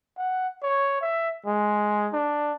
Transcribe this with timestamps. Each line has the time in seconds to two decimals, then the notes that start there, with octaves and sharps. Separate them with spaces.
0.17 F#5
0.63 C#5
1.01 E5
1.46 G#3
2.13 D4